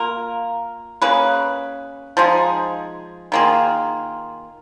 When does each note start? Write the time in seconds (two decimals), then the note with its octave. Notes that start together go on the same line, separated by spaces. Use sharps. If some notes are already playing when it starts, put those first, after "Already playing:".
Already playing: A#3 F4 A#4
1.02 A#3 C#4 G#4 B4
2.17 F3 G#3 D#4 G#4
3.32 D#3 A#3 F4 G#4